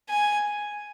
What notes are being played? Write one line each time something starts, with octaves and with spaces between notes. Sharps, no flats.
G#5